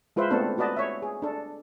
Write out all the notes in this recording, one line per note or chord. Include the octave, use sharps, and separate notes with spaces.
G#3 F4 B4 C5 E5
A3 B3 C4 D4 A4
F#4 B4 D5 D#5 A5
C#5 E5
G#4
D4 A4